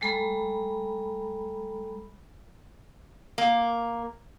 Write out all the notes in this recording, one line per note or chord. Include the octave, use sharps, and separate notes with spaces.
G3 G#3 A4 A#5 B5
A#3